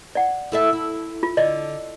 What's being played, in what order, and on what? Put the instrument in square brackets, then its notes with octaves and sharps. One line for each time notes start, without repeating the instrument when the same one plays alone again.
[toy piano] D5 F#5
[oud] E4 A4 E5
E4
[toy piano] F4
[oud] D3 [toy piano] D5 D#5